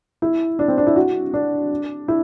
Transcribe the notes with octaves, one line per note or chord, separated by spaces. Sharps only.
E4
D4
C4
D4
E4
F#4
D4
E4